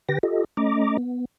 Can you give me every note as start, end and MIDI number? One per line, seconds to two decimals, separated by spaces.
0.09 0.19 50
0.09 0.19 67
0.09 0.19 71
0.09 0.19 79
0.09 0.19 94
0.23 0.44 65
0.23 0.44 67
0.23 0.44 69
0.23 0.44 75
0.57 0.97 57
0.57 0.97 61
0.57 0.97 75
0.57 0.97 82
0.57 0.97 86
0.98 1.25 59